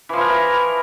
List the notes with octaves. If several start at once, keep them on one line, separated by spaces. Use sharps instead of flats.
E3 F3 E4 A#4